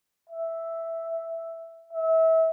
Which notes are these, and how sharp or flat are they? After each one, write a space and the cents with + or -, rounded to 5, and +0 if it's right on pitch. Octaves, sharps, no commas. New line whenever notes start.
E5 +0
E5 -30